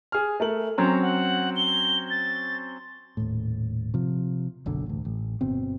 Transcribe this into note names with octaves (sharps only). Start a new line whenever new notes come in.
G#4 F6
A3 A#4 F#7
F#3 C4 C#4 A#5
F#5
G7
A6
D#1 A2
C3 F3
F#1 B1 D3
A1 D2
A1
G1 B2 C4